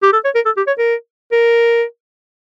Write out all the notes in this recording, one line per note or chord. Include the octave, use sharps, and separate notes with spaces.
G4
A4
C#5
A#4
A4
G4
C#5
A#4
A#4